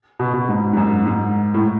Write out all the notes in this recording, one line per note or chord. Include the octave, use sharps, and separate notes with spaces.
B2
B2
G#2
G#2
F#2
G#2
A2